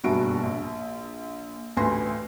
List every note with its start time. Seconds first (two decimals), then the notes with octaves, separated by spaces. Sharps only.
0.04 F#1 G2 B2 F#4 E5 D7
0.43 A#1
1.77 A1 D2 B4 G#5 C6 A#6